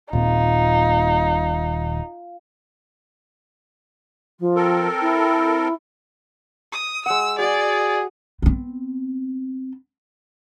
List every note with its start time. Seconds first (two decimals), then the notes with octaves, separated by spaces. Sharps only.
0.13 D#1 A#2 C4 D#4 F4
4.39 F3
4.55 C4 A4 A#4
5.01 E4
6.72 D#6
7.06 G#3 F#5 E6
7.39 F#4 G#4 D5 G#5
8.42 B3 C4